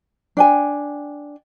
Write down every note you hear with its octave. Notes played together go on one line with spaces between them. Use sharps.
D4 G5 G#5